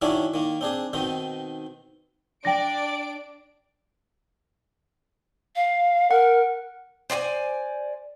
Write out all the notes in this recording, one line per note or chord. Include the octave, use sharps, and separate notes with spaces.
D#3 F#3 C#4 D4 E4 D5
D#3 A#3
C4 D4 G#4
B2 D#3 C4 D#4
D4 D5 G5 A#6 D7
F5
A#4 F#5
C5 D5 G5 G#5